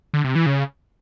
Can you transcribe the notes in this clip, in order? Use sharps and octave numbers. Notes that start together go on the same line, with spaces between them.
D3
C3
E3
C#3